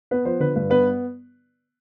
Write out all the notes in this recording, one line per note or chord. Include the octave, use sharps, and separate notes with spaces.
B3 B4
F3 C5
D3 B4
G2 B4
B3 B4